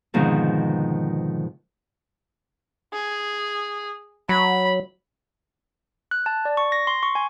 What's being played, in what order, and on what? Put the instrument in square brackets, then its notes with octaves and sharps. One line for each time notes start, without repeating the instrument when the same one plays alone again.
[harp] G#2 B2 D3 D#3 F3 C4
[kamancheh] G#4
[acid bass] F#3 [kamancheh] B5
[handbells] F#6
A5
D5
C#6
A#6
C6
C#6
G#5